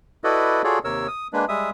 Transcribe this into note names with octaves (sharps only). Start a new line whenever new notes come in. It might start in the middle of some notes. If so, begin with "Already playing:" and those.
E4 F#4 A4 B4 D5 D#5
F4 F#4 G#4 A4 C#5 D5
D#2 C3 A#4 C#5 E6
D#6
G#3 A#3 D4 B4
G3 G#3 E5 D#6